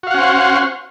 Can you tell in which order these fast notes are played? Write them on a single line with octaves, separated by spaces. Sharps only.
F#4 F5 F#5 C#4 C5